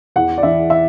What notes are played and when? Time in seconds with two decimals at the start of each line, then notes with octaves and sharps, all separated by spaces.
0.16 E2 F#5
0.38 D5
0.43 E3 E5
0.70 E5